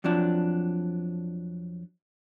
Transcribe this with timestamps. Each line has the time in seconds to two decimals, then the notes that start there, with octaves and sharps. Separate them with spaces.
0.04 F2 F3 F#3 D4